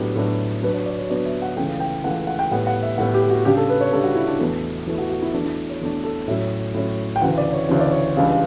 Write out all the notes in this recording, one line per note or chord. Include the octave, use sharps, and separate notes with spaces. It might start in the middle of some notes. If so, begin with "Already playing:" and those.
Already playing: A2 F#3 B3 D4 G4
A2 F#3 B3 D4
B2 F#3 B3 D4 B4
C#5
D5
C#5
B2 F#3 B3 D4 D5
E5
F#5
C#2 C#3 E3 A3 G5
G5
C#2 C#3 E3 A3 F#5
F#5
G5
A2 G3 B3 F#5
F#5
E5
A2 G3 B3 F#5
G4
F#4
C#3 G3 D4 G4
A4
B4
C#5
C#3 G3 D4 A4
F#4
E4
D4
E2 B2 A3
E2 B2 A3 E4
F#4
F#4
E4
E2 B2 A3 D4
E4
C#5
E2 B2 A3 D4
A4
A2 F#3 C#4 E5
A2 F#3 C#4
G5
D2 C#3 E3 F#5
D5
C#5
D2 C#3 E3 C#5
D5
C#5
C#2 C#3 E3 G3 D4